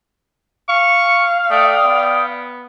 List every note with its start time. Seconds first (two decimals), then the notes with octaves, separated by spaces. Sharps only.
0.69 F5 C#6
1.50 A3 D5 G5 D#6
1.85 B3